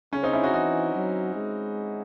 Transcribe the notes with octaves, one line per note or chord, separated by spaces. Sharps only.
C#3 C#4
C4 D#4
C#4 E4
D#4 F#4
E3 D#4 F#4
F#3
G#3